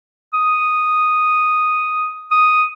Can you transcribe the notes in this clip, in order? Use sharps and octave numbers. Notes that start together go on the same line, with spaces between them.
D#6
D#6